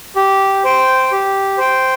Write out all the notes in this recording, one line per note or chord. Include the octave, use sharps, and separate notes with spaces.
G4
C5 G5
G4
C5 G5